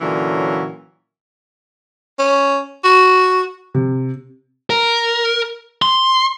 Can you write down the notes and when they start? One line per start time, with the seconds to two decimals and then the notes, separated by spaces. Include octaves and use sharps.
0.01 A#2 D3 E3 F#3 C#4
2.19 C#4
2.84 F#4
3.74 C3
4.70 A#4
5.82 C6